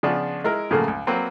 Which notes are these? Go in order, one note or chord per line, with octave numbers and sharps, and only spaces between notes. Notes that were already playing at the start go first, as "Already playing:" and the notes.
C#3 F3 B3 D4
G#3 E4 A#4
A2 C#3 F3 F#3 A3 A#3
C#2
F#3 A#3 C4 B4